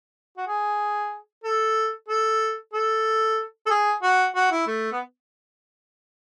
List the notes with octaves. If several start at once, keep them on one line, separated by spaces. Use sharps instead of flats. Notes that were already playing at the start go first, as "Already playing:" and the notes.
F#4
G#4
A4
A4
A4
A4
G#4
F#4
F#4
E4
A3
B3